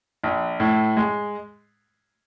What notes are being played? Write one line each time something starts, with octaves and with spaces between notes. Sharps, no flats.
A#1
A2
G#3